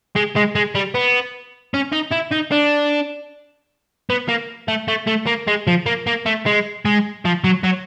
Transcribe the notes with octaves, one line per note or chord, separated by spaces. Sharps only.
G#3
G#3
G#3
G3
B3
C#4
D#4
E4
D#4
D4
B3
A#3
A3
A3
A3
A#3
G#3
F3
A#3
A#3
A3
G#3
G#3
F3
F#3
F#3